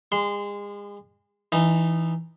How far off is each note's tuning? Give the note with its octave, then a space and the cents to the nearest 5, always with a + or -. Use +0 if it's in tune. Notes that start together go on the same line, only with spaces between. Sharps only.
G#3 -35 C6 -25
E3 +0 D#4 -20